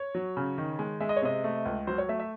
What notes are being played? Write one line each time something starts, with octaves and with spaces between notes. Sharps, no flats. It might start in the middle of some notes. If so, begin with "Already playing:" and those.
Already playing: C#5
F#3
C#3
D#3
G#3
G#3 E5
D#5
C#5
C3 D#5
A3
C#2
F#3 C5
C#5
A3 E5
E5